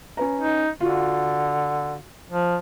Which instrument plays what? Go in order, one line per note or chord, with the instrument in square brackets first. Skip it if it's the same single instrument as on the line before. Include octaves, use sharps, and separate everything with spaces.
[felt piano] C#4 B4 A#5
[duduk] D#4
[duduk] D3 [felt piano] F4 F#4
[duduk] F3